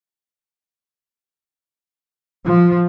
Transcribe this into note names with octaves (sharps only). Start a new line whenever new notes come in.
F3